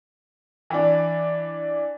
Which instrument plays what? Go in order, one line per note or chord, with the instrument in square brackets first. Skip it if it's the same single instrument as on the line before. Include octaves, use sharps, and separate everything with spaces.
[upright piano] E3 D4